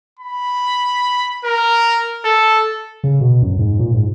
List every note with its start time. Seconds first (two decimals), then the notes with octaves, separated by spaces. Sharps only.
0.19 B5
1.45 A#4
2.25 A4
3.04 C#3
3.21 B2
3.42 F#2
3.59 G#2
3.79 A#2
3.94 G#2